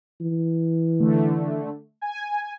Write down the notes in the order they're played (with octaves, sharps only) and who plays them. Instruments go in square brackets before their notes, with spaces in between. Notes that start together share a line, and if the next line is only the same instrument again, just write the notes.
[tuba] E3
[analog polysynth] D3 A3
G#5